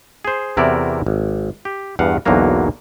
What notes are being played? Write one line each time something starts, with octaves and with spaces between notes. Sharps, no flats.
G#4 C5
E2 C3 E4 F#4 A#4 D5
G#1
G4
E2 G2 F5 F#5
B1 E2 D3 F#3 A#3 A#5